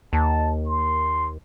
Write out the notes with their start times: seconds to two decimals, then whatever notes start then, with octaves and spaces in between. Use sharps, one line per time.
0.13 D#2 A5
0.66 C6